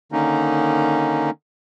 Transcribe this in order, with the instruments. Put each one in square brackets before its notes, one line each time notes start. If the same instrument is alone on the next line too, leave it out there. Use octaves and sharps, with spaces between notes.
[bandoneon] D3 D#3 A#3 C#4 D#4